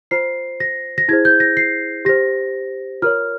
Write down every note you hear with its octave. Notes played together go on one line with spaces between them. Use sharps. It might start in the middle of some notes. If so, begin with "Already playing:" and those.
F4 C5 C7
A#6
A#6
E4 G#4 C5 G#6
G6
A#6
C7
G4 C5 A#6
F4 A#4 C#5 F6